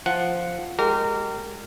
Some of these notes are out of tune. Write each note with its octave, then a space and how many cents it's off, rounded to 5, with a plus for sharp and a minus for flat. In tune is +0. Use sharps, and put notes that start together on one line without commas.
F3 +0 F#5 +0
G#3 -10 G4 -30 A#4 -25